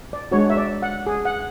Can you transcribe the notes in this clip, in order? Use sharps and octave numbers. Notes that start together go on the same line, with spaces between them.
D5
G#3 D4 F#4 C#5
E5
D5
F#5
G#4
F#5